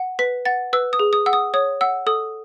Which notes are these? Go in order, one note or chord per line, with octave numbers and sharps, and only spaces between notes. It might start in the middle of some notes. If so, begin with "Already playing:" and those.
Already playing: F#5
B4 B6
F#5 A6
B4 E6
D#6
G#4
D#6
F#5 E6
D#6
C#5 D#6
F#5 E6
A4 D#6